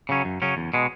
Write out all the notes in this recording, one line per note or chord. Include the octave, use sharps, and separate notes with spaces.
C#3 F#3 C#4
F#2
C#3 F#3 C#4
E2
B2 G#3